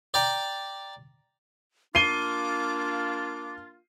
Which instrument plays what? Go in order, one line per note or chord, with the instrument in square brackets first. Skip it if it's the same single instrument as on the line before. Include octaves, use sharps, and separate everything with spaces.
[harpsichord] D5 G5 A#5
[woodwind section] A#3 D4 F4 [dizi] D6 [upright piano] C7 D#7 G7